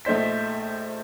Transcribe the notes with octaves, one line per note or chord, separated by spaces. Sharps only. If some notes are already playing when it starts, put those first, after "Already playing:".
A#1 A3 D#4 C5 B6